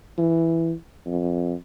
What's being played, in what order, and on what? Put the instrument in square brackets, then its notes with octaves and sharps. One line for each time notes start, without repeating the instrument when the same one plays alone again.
[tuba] E3
F2